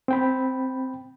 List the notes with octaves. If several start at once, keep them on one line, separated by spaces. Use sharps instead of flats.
C4 G5 B5